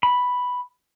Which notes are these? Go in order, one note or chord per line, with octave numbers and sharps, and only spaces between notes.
B5